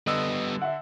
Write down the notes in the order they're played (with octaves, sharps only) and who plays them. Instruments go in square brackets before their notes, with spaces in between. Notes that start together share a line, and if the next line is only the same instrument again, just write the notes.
[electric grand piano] D3 E6 [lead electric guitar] G3 B3 [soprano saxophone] D#5
[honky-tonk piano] E5 F#5